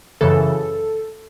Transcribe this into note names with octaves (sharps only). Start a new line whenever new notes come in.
F#2 C#3 E3 A4